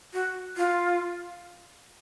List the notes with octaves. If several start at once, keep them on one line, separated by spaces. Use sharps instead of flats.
F#4
F4